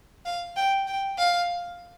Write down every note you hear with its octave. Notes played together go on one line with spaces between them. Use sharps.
F5
G5
G5
F5